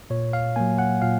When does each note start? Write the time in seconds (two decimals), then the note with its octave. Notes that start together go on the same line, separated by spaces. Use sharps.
0.10 A#2 C#5
0.33 F5
0.56 F#3 A#3 G#5
0.78 F#5
1.02 A#2 F5